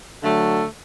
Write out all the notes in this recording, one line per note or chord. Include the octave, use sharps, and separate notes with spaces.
D3 F#3 A3